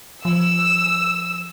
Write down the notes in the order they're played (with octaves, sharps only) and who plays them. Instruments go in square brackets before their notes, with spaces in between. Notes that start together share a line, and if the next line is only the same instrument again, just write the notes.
[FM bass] F3 [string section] E6